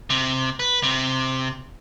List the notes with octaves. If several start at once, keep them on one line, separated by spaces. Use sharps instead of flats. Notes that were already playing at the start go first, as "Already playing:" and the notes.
C3
B4
C3